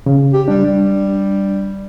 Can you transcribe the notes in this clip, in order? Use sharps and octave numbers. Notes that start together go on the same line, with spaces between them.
C#3
G4
G3 D4
G3